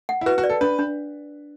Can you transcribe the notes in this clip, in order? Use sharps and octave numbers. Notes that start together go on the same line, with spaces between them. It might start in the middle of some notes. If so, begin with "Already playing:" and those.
F#5
E4
F#4 B4
F#4
D5
A4
D4 B4
D4